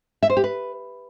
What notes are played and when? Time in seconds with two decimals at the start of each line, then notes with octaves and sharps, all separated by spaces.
0.23 E5
0.30 C5
0.37 G4
0.44 B4